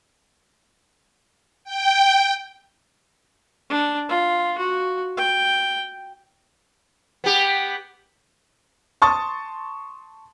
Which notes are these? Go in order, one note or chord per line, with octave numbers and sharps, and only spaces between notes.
G5
D4
F4
F#4
G5
B3 G4
A5 C6 C#6 D#6 A6